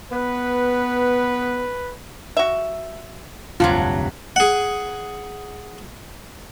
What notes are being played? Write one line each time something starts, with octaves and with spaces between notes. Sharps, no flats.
B3 B4
F#4 E5
F1 D2 G2 C3 F#3 F4
G#4 F#5